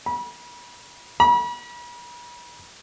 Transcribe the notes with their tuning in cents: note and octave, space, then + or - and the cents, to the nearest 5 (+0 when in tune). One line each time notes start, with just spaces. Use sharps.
B5 -35
B5 -40